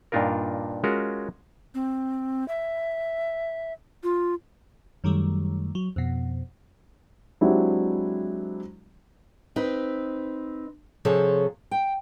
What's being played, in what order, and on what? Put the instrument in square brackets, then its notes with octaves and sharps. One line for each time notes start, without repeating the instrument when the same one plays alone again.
[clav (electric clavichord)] G2 A#2 D4 D#4 F4 A#4
G#3 C#4 F4 F#4 A#4
[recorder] C4
E5
F4
[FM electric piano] F#2 D#3 F#3 G3 A3
F#3
F2 B2
[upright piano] F#3 G#3 C4 D4 E4 G4
[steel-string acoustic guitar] C4 D#4 B4
C3 F3 G#4 A4 C#5
G5